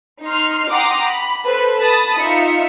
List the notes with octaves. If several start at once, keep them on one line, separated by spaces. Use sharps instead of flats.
D#4 C6 F6
F#5 G5 A#5 C6 D6 D#6
B5
A4 B4 C5
A5 B5 D#6 A6
D#4 F4 E5 C#7